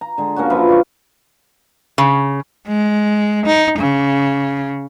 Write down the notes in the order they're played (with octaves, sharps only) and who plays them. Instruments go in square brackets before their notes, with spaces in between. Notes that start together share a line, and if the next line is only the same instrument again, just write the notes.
[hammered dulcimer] A#5
D3 G#3
A#3 C#4 D4 F#4
F#2 F3 B4 E5
D5 F5 C#6
[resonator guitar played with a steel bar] C#3
[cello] G#3
D#4
C#3